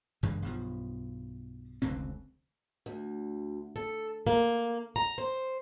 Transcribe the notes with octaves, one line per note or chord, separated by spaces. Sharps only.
F#1 G2 E3 G#3
B1 G2 F3
F1 C#2 D3 C4
D2
A4
A#3
A#5
C5